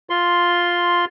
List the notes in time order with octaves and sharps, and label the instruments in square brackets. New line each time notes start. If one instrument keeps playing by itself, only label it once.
[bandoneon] F4 C6